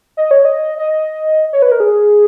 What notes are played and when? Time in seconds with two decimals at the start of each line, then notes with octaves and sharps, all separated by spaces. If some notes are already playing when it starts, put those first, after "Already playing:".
0.17 D#5
0.31 C#5
0.45 D#5
0.78 D#5
1.53 C#5
1.62 B4
1.72 A#4
1.80 G#4